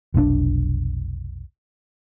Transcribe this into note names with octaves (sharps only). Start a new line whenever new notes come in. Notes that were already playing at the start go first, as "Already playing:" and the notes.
F1 B1 C4 D4